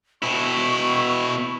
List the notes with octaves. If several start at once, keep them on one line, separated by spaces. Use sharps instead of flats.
B2 E4 C#6